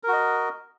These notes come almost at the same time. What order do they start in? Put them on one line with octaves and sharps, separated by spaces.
A#4 F#4 D#5